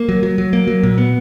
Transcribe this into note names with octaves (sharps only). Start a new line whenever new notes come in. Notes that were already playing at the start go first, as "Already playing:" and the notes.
Already playing: A#3
F#3
F#3
F#3
A#3
F#3
A#2
B3